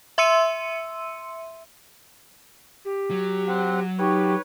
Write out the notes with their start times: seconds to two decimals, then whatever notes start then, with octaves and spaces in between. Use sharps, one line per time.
0.18 E5 C6 E6 C#7 D#7
2.85 G4
3.11 F#3
3.48 C4 F#5
3.99 D#4 G4 B4 C#5 G5 C#6